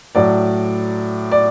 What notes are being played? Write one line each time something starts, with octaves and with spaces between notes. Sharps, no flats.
A2 F#3 D5
D5